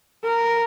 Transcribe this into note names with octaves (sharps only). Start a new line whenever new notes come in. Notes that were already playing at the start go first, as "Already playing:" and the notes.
A#4